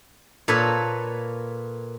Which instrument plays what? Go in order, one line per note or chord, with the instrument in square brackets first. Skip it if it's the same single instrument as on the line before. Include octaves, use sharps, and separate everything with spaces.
[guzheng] A#2 A4 B4 C#5 A#5